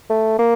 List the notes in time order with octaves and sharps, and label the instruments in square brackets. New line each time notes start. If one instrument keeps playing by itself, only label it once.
[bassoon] A3
A#3